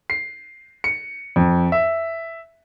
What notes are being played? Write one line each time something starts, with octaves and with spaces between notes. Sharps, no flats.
C7
C#7
F2
E5